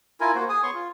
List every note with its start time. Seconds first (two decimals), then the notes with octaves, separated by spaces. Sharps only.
0.21 E4 F4 A#4 G#5
0.35 A#3 F#4 C5
0.49 G#4 G#5 D#6
0.63 B3 C#5 C6 C#6
0.74 F4